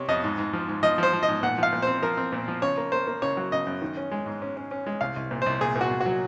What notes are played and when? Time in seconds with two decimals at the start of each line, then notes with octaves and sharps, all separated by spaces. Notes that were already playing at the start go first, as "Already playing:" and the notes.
Already playing: C3 C#5
0.09 F2 D#5
0.24 G#2
0.38 G#2
0.53 F3
0.68 G#2
0.83 F3 D#5
0.98 F3 C5
1.13 F3
1.23 D#5
1.28 G#2
1.43 A#2 F#5
1.58 F3 F5
1.73 A#2
1.82 C4 C5
2.02 F3 A#4
2.18 C4
2.32 A#2
2.48 F3
2.62 C#3 C#5
2.77 A#3
2.92 A#3 C5
3.07 A#3
3.22 C#3 C#5
3.37 F#3
3.52 C#3 D#5
3.67 F#2
3.82 D#3
3.97 C#4
4.11 G#3
4.26 G#2
4.42 C#4
4.57 C#4
4.71 C#4
4.86 G#3
5.01 C2 F5
5.16 C2
5.31 A#2
5.42 C2 C5
5.61 A#2 G#4
5.76 A#2
5.81 F#4
5.91 A#2
6.01 F#4
6.06 F#3